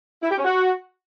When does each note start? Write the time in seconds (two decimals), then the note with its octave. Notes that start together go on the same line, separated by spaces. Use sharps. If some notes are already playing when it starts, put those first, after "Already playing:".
0.22 E4
0.30 G4
0.37 C#4
0.45 F#4